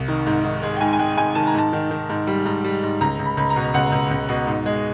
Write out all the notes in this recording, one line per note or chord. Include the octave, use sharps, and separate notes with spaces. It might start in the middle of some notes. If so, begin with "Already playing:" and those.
Already playing: C2
D#3
G#2
D#3
G#3
G5
G#2 G#5
G#5
G#3 G5
G#2 G#5
D#3 A5
A#5
G#2 A5
D#3
D#3
G#2
G3
G#2
G3
G#2
C#2 A#5
C#2
B5
C#2 B5
A#5
B2
C#2 F#5
C#2
C#2
B2
G#2
G#3